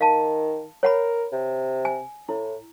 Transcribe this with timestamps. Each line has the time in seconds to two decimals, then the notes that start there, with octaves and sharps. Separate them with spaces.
0.01 D#3 F5 A5
0.83 A#4 C#5 F#5 B5
1.32 C3
1.85 G#5
2.29 A2 E4